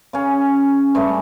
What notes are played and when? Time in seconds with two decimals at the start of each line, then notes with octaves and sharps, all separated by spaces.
0.13 C#3 C#4
0.95 G2 A3 C#4